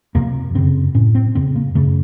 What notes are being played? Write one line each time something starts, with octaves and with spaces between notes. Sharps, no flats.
F2 C3 A#3
F#2 C#3 C4
A2 C#4
C4
F2 C#3 C4
A#3
F#2 C#3 A3